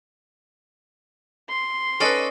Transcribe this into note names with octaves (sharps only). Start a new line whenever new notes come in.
C6
C#4 A4 B4 D5 D#5